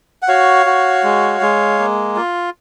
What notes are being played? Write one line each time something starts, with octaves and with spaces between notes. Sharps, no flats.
F#5
F#4 C#5 F5
F#4
G#3
G#3
A#3
F4